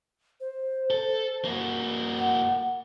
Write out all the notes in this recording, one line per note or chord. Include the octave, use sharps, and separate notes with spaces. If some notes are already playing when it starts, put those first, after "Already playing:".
C5
A4
A#3 F#4
F#5